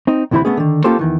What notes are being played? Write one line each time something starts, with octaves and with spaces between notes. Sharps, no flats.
C4 D#4
D2 C3 E3 E4 C5 B5
A3 B3 C#4 G#4
D3 D#3
A#3 C#4 F4 G4 A4 C5
E2 D#3 E3